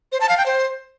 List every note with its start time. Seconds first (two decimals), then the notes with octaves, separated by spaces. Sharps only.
0.12 C5
0.21 A5
0.29 F5
0.38 G5
0.46 C5